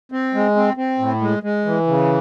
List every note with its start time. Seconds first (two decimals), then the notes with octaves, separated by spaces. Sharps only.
0.12 C4
0.34 G#3
0.56 C4
0.77 C4
0.99 A2
1.21 G#3
1.43 G#3
1.65 E3
1.87 C#3